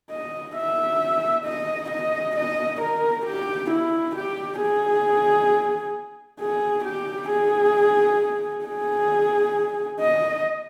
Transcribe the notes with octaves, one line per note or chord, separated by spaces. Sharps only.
D#5
E5
D#5
D#5
D#5
A#4
G4
E4
G4
G#4
G#4
G4
G#4
G#4
D#5